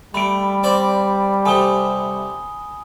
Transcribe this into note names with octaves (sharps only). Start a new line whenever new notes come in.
G3 A3 B5 D7
C4 D5 G5
C3 A3 G#5 D#6 G7